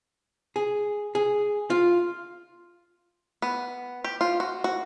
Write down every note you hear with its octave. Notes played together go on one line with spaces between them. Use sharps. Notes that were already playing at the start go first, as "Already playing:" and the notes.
G#4
G#4
F4
B3
G4
F4
F#4
F#4